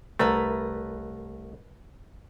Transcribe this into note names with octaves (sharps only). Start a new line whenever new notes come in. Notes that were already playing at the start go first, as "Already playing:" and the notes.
C2 A3 A#4 B4